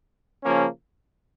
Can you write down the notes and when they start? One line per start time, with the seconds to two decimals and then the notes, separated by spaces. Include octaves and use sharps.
0.44 C#3 F3 A#3 C#4